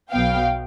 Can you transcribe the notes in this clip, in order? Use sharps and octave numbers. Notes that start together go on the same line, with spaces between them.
B1 B2 F#3 B3 F5 G5